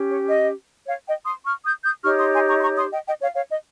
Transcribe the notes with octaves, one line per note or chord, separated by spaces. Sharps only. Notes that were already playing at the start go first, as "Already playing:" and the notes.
Already playing: C#4 G4
C#5
D#5
C#5 F5
D#5 G5
C6 D#6
C#6 F6
D#6 G6
D#6 G6
D#4 G4 C#5 C#6 F6
C6 D#6
G#5 C6
A#5 C#6
C6
A#5 C#6
C6 D#6
D#5 G5
D#5 G5
C#5 F5
C#5 F5
D#5